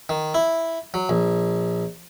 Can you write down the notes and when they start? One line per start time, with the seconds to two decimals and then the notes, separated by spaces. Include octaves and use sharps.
0.09 D#3
0.34 E4
0.94 F#3
1.09 A#1